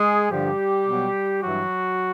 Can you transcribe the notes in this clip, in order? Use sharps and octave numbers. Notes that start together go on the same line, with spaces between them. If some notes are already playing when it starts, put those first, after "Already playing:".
Already playing: G#3 G#4
G2 D3 F3 G3 G4
B2 F#3
G2 E3 F#3 F#4